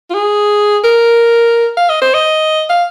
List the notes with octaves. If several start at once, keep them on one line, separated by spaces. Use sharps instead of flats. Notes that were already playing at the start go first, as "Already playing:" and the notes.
F4
G#4
A#4
F5
D#5
C5
D#5
F5